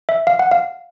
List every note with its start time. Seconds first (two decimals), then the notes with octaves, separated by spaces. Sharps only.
0.09 E5
0.27 F5
0.39 F#5
0.51 F5